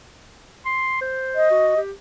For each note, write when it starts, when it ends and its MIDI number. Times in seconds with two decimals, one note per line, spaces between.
0.66 1.01 84
1.01 1.47 72
1.35 1.79 75
1.51 1.74 66
1.77 1.92 67